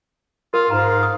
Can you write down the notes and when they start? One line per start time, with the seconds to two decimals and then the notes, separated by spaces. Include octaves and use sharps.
0.54 F4 A#4
0.70 G#2 F5 A#5
1.03 D#6